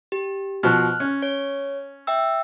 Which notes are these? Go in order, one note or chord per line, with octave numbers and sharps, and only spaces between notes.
G4
B2 F3 F6 F#6
C#4
C#5
E5 G5 E6